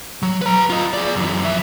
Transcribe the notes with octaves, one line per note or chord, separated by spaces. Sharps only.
F#3
B4 A#5
F4 D#5
G#4 D5
F#2 E3
F3 E5